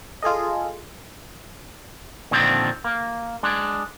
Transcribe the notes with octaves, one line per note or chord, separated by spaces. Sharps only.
F4 G#4 A4 D#5
A#2 D3 D#3 F3 C4 D4
A#3
G#3 D4